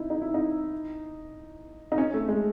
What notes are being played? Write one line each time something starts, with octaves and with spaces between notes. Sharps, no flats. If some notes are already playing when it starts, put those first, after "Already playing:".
Already playing: D#4 E4
D#4
E4
D#4
D#4
C#4
A3
G#3